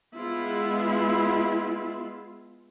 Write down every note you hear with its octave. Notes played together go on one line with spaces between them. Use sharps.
G#3 B3 E4 F4